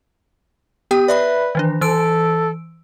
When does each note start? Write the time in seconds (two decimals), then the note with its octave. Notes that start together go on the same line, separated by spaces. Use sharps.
0.91 B3 G4 G5
1.08 B4 D5 E5 B5
1.55 D#3 E3 D4
1.81 E3 A4 E6 D7